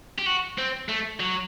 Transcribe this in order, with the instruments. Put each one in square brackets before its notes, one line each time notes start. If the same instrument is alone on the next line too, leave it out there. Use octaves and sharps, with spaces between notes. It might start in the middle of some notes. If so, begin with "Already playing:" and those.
[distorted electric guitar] G4
F#4
C4
A3
F#3